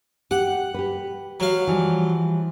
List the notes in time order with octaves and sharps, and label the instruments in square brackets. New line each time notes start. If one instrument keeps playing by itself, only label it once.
[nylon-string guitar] G4 [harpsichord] F#5
[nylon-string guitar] G4 B4
[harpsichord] F#3 F5
[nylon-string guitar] E3 F3 G3